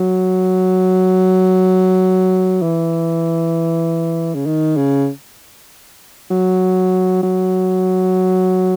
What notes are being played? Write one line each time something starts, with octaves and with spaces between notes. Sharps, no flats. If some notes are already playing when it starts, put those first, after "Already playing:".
Already playing: F#3
E3
C#3
D#3
C#3
F#3
F#3